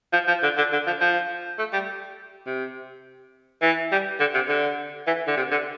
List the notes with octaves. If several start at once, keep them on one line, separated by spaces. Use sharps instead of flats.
F3
F3
D3
D3
D3
F3
F3
A3
G3
C3
E3
G3
D3
C3
D3
E3
D3
C3
D3